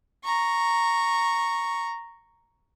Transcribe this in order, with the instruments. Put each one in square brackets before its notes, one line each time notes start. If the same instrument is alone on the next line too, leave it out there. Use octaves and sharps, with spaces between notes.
[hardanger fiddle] A#5 C#6